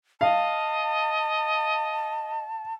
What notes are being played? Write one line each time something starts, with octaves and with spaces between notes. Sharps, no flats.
D#5 F5 A5